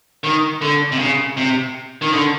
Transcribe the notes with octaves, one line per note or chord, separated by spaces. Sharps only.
D#3
D3
C3
C#3
C3
D#3
D3